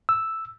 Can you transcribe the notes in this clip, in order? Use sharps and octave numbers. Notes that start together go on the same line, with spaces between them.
E6